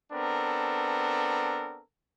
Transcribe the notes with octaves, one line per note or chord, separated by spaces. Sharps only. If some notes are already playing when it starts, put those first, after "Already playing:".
B3 C4 D4 A4 A#4